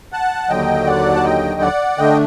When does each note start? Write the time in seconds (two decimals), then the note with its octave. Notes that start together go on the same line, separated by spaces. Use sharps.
0.12 F#5 A5
0.49 D#2 D3 F#3 D#5 G5
0.87 D5 F#5
1.15 A5
1.24 D#5 G5
1.61 D5 F#5
1.98 D3 A3 D4 D#5 G5